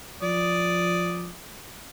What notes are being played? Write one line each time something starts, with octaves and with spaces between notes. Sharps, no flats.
F3 D5 D#6